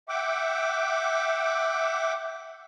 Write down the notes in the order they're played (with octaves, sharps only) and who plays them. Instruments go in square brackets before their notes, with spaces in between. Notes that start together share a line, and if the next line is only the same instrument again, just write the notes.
[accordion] E5 F#5 G5 D6